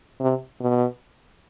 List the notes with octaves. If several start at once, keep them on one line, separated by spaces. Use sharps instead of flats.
C3
B2